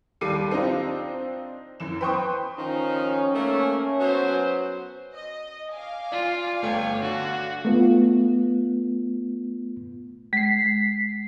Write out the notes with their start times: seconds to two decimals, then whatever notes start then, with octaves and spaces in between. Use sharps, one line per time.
0.21 D#2 G3 A4 D6 C7 D#7
0.51 C4 D4 D#4 F4
1.80 F#2 E3 E7
2.01 B4 C5 G5 C6 C#6 D#6
2.58 D#3 F3 C#4 D#4
3.35 A3 A#3
4.00 F#3 B3 C5
5.14 D#5
5.72 F5 G#5 D6
6.12 F4 D5
6.62 G1 A3 C#5 G5
7.02 D3 F#4 C#6 A6
7.65 A3 B3 F4
10.33 G#3 B6 C7